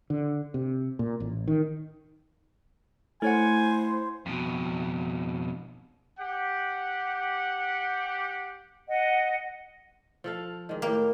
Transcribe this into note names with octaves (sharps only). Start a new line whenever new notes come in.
D3
C3
A#2
A1
D#3
A3 E4 C5 C#5 F#5 G#5
F2 B2
G4 F#5
D#5 F#5
F3 A4 F5
G#2 D#3
A2 A#3 G4